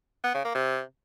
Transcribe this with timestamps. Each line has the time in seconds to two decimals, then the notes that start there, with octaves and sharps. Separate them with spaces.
0.24 B3
0.34 C#3
0.45 A#3
0.55 C3